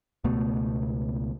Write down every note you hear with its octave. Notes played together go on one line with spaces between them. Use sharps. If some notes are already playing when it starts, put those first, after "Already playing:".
C#2 B2 A3 B3